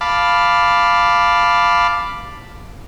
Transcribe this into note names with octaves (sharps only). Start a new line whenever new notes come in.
F5 A5 B5 D6